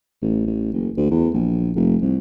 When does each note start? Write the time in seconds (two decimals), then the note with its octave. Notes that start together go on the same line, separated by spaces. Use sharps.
0.22 A1
0.46 A1
0.73 F#1
0.97 D2
1.11 E2
1.34 A#1
1.76 F1
2.02 C2